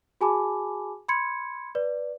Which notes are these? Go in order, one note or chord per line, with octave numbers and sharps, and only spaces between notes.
F#4 G#4 G#5 A5 B5 D6
B5 C6 G#6 C#7
B4 D5